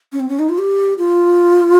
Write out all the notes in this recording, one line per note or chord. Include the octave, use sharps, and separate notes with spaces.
C#4
C4
C#4
D#4
F4
G4
F4